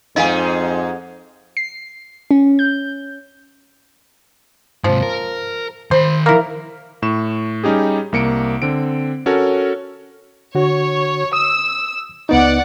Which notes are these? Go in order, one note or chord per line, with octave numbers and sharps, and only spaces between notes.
F2 G#2 G#3 D#4 D#5 F5 G#5
C7
C#4
G6
G#2 C3 F3
A#4
D#3 C5 B5
A#3 E4 A#4
A2 C#6 E7
G3 C#4 D#4 G4 G#4
C2 A#3 C#7 D7
D3 C4 D7
C#4 F#4 A4 A#4 C#5
D3 F#4 C#5
D#6 E6
C#2 B3 D#4 D5 F#5